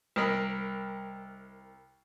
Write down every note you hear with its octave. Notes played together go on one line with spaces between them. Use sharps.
C2 A#4 D#5 B5